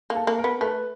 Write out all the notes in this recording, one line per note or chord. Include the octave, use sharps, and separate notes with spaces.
A#3
A4
A#3
A#4
B3
A3 B4